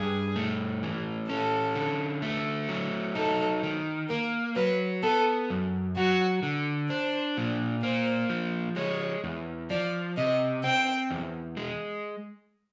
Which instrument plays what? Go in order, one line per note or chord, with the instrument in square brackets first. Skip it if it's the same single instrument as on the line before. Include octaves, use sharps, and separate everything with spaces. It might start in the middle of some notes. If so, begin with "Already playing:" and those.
Already playing: [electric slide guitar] G2 D4 [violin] G#4
[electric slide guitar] A3
E3
[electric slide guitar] C#4 [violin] A4
[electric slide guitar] D3
A3
F#3
[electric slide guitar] D#4 [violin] A4
[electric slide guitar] D#3
[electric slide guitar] A#3 [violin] A#4
[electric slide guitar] F#3 [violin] B4
[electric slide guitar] B3 [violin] A4
[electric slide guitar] F#2
[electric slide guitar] F#3 [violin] F#4
[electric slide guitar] D3
[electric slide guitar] D4 [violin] C5
[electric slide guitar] A#2
[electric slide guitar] A#3 [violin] C5
[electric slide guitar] F3
[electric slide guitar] G#3 [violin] C#5
[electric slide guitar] E2
[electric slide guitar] F3 [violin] D5
[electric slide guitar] C3 [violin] D#5
[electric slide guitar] C4 [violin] G5
[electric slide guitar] E2
G#3